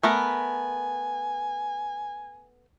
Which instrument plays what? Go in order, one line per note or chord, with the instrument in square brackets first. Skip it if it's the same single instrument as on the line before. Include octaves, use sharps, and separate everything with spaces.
[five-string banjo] A3 B3 A#4 [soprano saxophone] G#5